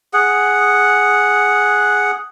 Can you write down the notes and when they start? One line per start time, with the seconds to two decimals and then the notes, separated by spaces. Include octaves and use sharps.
0.13 G#4 F#5